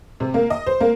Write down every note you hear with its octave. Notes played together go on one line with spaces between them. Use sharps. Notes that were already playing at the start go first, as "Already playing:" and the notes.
C3
A#3
D#5
C5
A#3